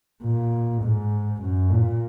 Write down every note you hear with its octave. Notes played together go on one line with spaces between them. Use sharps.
A#2
G#2
F#2
A#2